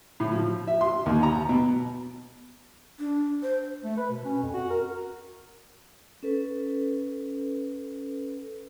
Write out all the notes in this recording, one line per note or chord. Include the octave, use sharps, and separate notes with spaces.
A2
F3
E5
C6
D#2
A#5
B2
D4
C5
A3
B4
B2
C#4
F2
F#4
A#4
C#4 A4 B4